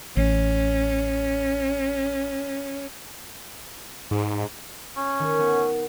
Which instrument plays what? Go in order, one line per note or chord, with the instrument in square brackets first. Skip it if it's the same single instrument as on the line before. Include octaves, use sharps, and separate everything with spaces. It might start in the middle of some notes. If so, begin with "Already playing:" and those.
[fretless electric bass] A1 [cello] C#4
[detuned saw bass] G#2
[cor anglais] C#4
[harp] D#3
B3